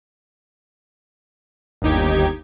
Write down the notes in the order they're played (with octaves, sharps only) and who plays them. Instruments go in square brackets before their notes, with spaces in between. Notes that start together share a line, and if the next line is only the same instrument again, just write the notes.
[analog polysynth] G1 D#2 D#4 G4 G#6